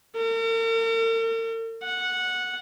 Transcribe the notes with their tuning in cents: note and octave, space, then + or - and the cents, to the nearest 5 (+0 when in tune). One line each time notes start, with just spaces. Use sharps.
A#4 -45
F#5 -10